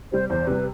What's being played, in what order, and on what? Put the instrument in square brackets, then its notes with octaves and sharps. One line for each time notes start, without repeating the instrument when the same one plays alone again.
[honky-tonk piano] C3 G3 [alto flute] C5
[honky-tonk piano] E2 [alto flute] C5
[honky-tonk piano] C3 G3 [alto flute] B4